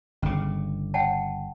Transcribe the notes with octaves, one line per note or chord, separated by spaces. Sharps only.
G1 C#3 C#4 D6
F#5 G5 A5